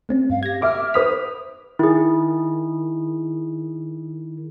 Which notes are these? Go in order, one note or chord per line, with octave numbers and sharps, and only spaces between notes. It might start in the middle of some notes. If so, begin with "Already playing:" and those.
A3 C4 C#4
G2 F5
G4 G#6 A#6
E5 D6 F6
B4 C5 D#6 B6 F7
D#3 E4 G#4